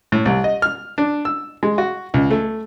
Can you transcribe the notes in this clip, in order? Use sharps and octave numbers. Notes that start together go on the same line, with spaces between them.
A2
C2
D#5
F6
D4
E6
G#3
F#4
C#2
A3